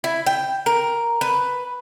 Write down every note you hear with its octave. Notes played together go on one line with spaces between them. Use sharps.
E4
G5
A#4
B4